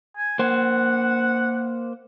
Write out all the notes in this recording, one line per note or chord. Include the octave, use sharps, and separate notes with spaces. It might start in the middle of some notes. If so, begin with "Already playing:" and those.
G#5
A#3 C5 F#5